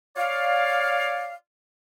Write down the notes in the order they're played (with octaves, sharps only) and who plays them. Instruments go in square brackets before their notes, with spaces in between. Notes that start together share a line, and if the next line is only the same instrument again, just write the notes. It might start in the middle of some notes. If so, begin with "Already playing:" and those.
[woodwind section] C#5 D5 F5